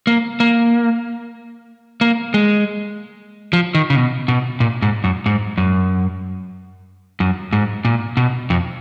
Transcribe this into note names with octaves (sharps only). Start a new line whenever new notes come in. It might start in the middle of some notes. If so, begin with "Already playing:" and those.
A#3
A#3
A#3
G#3
F3
D#3
C#3
B2
B2
A#2
G#2
F#2
G#2
F#2
F#2
G#2
A#2
B2
F2